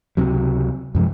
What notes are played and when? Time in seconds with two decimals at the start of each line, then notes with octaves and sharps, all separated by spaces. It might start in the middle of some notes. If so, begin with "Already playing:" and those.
0.17 C#2 C3 F#3
0.95 F#2 C3 F3 G#3